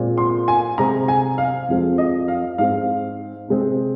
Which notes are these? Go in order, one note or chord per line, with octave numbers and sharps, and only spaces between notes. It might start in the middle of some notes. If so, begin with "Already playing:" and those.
Already playing: A#2 G#3 C4
C6
G#5
C3 G#3 C4 A#5
G#5
F5
F2 F3 G#3 C4
D#5
F5
G#2 G#3 C4 F5
C3 G#3 C4